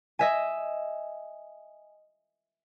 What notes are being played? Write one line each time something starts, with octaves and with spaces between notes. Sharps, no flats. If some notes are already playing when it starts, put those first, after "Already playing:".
D#5 E5 G#5